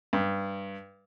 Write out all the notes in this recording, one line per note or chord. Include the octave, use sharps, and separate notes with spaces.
G2